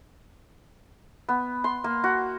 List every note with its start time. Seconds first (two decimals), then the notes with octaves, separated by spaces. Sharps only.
1.29 B3
1.64 C6
1.84 A#3
2.04 F#4